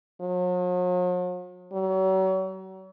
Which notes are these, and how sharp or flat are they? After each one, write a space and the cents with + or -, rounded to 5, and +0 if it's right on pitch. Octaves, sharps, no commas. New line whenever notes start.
F#3 -45
F#3 +40